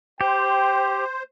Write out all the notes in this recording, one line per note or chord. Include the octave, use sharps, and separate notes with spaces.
G4 C5 G5